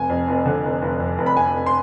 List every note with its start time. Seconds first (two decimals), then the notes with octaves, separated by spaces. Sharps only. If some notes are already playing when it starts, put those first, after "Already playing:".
Already playing: F1 G#5
0.09 F2
0.28 F1
0.45 D3
0.64 F1
0.82 F1
1.00 F2
1.18 F1
1.26 B5
1.36 F1 G#5
1.54 F1
1.66 C6